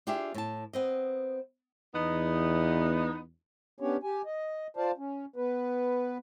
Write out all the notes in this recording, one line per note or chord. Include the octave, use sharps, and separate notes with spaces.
D4 F4 G4 G#4 E5
A2 A5
B3 C4 D#5
E2 B3 D#4
B3 C#4 D4 G4 C#5
G4 G#5
D#5
F4 C5 D5 F5 A5
C#4
B3 B4